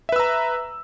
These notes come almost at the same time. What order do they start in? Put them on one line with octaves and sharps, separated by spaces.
E5 B4 E6 A#5